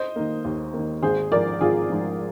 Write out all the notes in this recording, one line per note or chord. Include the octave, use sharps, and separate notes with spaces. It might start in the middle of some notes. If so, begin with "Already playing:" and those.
Already playing: C5 D#5
D#3 A#3
D#2
D#3 A#3
G#1 G#4 C5
G#2 F3 A#4 D5
G#1 F4 G#4
G#2 F3